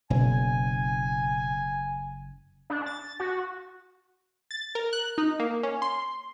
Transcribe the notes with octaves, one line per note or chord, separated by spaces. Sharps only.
F#1 B2 G#5
D4
A6
F#4
A6
A#4
F#6
D#4
A#3
C#4
C6